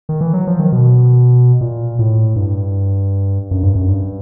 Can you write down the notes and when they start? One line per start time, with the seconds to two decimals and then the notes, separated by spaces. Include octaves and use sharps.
0.09 D#3
0.21 E3
0.33 F#3
0.47 F3
0.59 D#3
0.72 B2
1.61 A#2
1.99 A2
2.36 G2
3.51 F#2
3.63 G2
3.75 F#2
3.88 G2